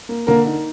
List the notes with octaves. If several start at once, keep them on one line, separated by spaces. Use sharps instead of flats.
A#3
D3 A#3 A#4
D#4